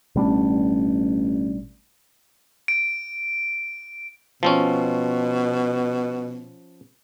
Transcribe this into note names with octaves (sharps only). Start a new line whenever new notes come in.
A1 B2 G3 D4
D7
B2 F3 C4 C#4